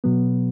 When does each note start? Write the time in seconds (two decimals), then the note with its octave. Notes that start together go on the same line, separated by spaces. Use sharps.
0.04 B2 F#3 B3